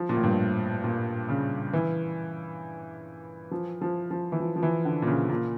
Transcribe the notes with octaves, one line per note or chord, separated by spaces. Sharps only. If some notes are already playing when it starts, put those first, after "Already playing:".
Already playing: F3
A#2
A2
G2
A#2
C#3
E3
F3
F3
F3
E3
F3
F3
E3
D3
A#2
C#3
A#2